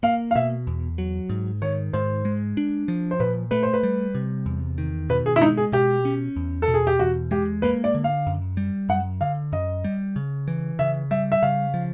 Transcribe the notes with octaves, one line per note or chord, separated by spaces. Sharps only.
A#3 F5
F5
B2 E5
E2
F#3
G#2
D#3 C#5
G#2 C5
G#3
D4
F3
C5
A#2 B4
A3 B4
C5
B4
G3
C3
E2
D#3
B2 B4
G#4
E4
G#3 D#4
G#4
B2 G4
C#4
E2
A4
B2
G#4
G4
E2 F#4
G#3 G4
A#3 B4
D5
D3
F5
F#2
G3
F#2 F#5
D3 F5
F#2 D#5
G3
C#3
E3
C#3 E5
G3 E5
E5
C#3 F5
F3